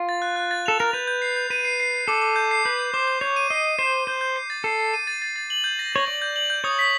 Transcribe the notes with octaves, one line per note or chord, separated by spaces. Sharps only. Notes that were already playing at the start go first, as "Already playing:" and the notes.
Already playing: F4
A6
F#6
F#6
A6
A4 F7
A#4 F7
B4 G6
G6
C7
G6
B4 D#7
C7
C7
C7
A4 D6
D6
G6
C7
B4 G6
G6
C5 D6
G6
C#5 G6
D#7
D#5 C7
D#7
C5 C7
D#7
C5 G6
G6
C7
A6
A4 C7
C7
D#7
A6
A6
A6
F#7
G6
A#6
C#5 A#6
D5 F#7
G6
F#7
G6
C#5 D#6
B6